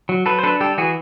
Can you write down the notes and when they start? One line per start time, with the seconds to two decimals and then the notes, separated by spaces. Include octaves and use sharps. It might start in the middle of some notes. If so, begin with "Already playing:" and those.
0.09 F#3
0.26 F#3 A4 B4
0.39 C5
0.43 D4 A4 B4
0.60 G3 G4 A4
0.78 E3 F#4 G#4